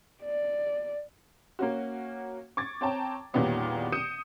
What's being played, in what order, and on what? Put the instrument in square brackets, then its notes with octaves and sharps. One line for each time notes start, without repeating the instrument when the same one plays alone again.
[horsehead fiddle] D5
[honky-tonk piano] A#3 C#4 F#4
C#6 D6 G#6 A6
C4 C#5 G5 A5 A#5
E2 A#2 D#3 G3 B3 C#4
D#6 G6 C#7 D#7 E7